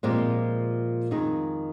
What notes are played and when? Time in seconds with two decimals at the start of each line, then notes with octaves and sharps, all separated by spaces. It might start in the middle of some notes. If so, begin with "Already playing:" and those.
0.03 A#2 F3 G#3 C4 G4
1.11 F2 D#3 G#3 D#4 G#4